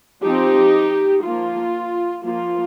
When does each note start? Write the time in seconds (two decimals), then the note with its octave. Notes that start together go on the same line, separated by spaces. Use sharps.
0.22 F3 C4 D#4 G4
1.23 F3 A#3 F4
2.23 F3 A#3 F4